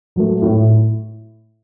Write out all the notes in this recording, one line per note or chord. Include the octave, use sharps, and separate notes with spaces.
F#3 A3
A2